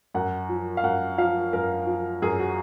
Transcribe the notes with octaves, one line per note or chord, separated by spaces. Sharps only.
F#2 F#5
F3
F5
F#2 F#5
F3 F5
F#2 A#4
F3
F#2 G#4
F#4